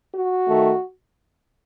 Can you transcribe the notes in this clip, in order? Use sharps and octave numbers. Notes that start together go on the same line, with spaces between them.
F#4
D#3 A3